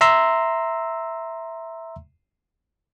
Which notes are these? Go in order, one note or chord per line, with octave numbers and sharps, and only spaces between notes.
E5 A#5 C6 E6